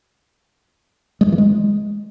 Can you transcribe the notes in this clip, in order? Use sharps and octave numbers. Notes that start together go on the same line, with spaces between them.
G#3
G2
E3
G#3